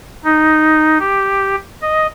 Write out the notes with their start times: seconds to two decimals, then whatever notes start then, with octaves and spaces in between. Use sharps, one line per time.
0.24 D#4
0.99 G4
1.82 D#5